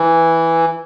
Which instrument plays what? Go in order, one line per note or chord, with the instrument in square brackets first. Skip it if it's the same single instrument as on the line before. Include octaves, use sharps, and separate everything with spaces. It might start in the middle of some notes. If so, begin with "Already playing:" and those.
Already playing: [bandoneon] E3